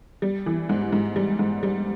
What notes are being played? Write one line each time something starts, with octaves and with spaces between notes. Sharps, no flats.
G3
E3
G#2
G#2
G3
G#2
G3